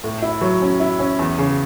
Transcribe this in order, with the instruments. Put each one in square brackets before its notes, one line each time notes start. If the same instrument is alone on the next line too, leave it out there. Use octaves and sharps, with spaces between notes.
[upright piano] A2
E4
F#3
C#4
E4
C#4
E2
C#3